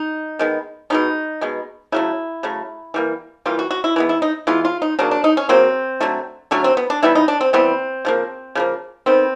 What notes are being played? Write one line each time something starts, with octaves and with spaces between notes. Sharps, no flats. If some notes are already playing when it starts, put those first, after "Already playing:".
Already playing: D#4
D#3 G#3 B3
B2 G#3 B3 D#4
B2 G#3 B3
C#3 F#3 A3 E4
C#3 F#3 A3
E3 G3 A#3
E3 G3 A#3 F4
F#4
F#4
E4
E3 G#3 B3
E4
D#4
E3 G#3 B3 F4
F4
D#4
C#3 F#3 A#3 D4
D4
D#4
C#4
C#3 F#3 A#3 C4
D3 F#3 A3
D3 F#3 A3 C#4
C4
B3
D4
E3 G3 B3 E4
D#4
D4
C4
E3 G3 B3 C4
C#3 F3 A#3
C#3 F3 A#3
D#3 G3 B3 C4